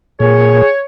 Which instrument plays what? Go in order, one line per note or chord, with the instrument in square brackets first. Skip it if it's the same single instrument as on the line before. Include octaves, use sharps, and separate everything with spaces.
[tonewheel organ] A#2 [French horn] G#4 [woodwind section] C#5